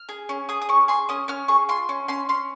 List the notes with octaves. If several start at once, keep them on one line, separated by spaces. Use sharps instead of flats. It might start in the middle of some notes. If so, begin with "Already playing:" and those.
Already playing: F6
G#4
C#4
G#4 D#6
D#6
C#4 C#6
G#4 C6
C#4 D#6
C#4 F6
G#4 C#6
F4 C6
C#4
C#4 C6
C#4 C6